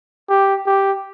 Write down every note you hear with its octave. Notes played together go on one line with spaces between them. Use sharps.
G4
G4